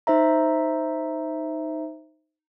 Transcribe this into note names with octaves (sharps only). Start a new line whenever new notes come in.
D#4 C5 E5 A#5